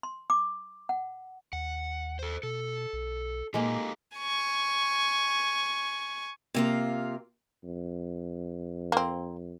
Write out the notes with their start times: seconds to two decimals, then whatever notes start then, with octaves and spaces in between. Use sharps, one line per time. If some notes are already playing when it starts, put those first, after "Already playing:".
0.03 C6
0.30 D6
0.89 F#5
1.53 D#2 F#5
2.19 A4 C5
2.43 B2 A4
2.93 B1
3.54 A#2 G#3 A#3 D#4 G4 A4
4.18 G#5 C#6
6.54 C3 A#3 F4
7.64 F2
8.92 A#3 C4